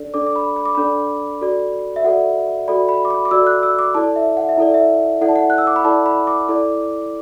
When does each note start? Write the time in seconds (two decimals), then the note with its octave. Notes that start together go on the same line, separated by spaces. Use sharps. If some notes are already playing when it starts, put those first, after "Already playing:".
Already playing: D4 A4 D5
0.14 D4 A4 D5 D6
0.26 D6
0.36 B5
0.56 B5
0.65 D6
0.75 D4 A4 D5 B5
1.41 F#4 A4 D5
1.96 E5
2.04 F#4 A4 D5 F#5
2.68 F#4 A4 D5 B5
2.89 B5
3.05 D6
3.10 B5
3.25 D6
3.31 F#4 A4 D5 E6
3.47 F#6
3.63 E6
3.79 D6
3.94 E4 A4 D5 A5
4.16 E5
4.37 F#5
4.49 E5
4.58 E4 A4 D5
4.74 E5
5.21 E4 A4 D5 F#5
5.29 A5
5.36 F#5
5.50 F#6
5.58 E6
5.67 D6
5.76 B5
5.85 E4 A4 D5 A5
6.06 B5
6.27 D6
6.49 E4 A4 D5